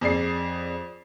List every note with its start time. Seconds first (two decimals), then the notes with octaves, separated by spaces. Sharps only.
0.01 F2 G#4 D5 C7